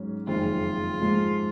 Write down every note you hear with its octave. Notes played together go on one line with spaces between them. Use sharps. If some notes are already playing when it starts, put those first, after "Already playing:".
Already playing: G#2 F#3 C#4
F#1 F2 D#3 G#3 C4 F4
G#2 F3 G#3